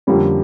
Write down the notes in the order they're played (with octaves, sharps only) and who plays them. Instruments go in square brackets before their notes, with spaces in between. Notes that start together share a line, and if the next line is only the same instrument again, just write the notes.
[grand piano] F2 D3 F3 A#3 C#4 [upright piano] G3